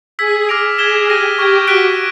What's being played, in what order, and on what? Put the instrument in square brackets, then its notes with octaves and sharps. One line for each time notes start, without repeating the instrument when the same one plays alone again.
[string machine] G#4 [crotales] E6 G#6 B6
[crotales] D6 F6 A#6 D7 F7
[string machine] G#4 [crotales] G#6 B6 E7 G7
[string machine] G4 [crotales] F6 A#6 D#7
[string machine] G4 [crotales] C#6 F6 G#6
[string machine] F#4 [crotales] F#6 B6 D7 G7